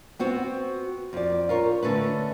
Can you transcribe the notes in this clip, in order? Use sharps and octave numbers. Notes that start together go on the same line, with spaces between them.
B3 C4 F#4
F2 D5
F4 A#4 C#5
D3 A3 C#4 B4